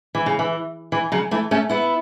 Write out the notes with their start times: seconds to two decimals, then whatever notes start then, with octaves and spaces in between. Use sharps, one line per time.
0.15 E3
0.26 C#3
0.39 E3
0.92 E3
1.12 C#3 F#3
1.31 E3 A3
1.51 A3 C#4
1.69 B3 E4